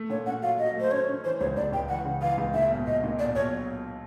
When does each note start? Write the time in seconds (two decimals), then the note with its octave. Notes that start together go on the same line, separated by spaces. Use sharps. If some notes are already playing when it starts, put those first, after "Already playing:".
Already playing: A3
0.10 A#2 C#5
0.26 C#4 F#5
0.42 F#3 F5
0.59 F#3 D#5
0.75 A3 C5
0.91 C#4 C#5
1.08 C#4
1.24 E3 C5
1.40 C#2 C#5
1.56 C#2 D5
1.73 C#2 G5
1.89 E3 F#5
2.05 C#3
2.22 E3 F5
2.38 C#2
2.54 A#2 E5
2.70 B1
2.87 B1 D#5
3.04 A#2
3.19 B1 D5
3.35 B1 C#5